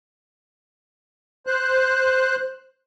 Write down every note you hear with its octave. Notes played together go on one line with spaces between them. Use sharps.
C5 F#6